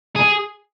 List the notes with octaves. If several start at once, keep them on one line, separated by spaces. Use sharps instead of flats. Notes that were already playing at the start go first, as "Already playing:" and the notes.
G#4